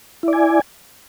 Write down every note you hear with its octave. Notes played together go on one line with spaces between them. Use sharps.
E4 D5 G#5